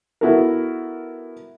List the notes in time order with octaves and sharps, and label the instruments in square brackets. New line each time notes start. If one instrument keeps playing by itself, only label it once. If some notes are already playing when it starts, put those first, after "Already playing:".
[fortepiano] B3 E4 F#4 A4 A#4